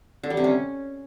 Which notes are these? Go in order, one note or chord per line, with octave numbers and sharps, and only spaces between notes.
D3
G3
C3
C#4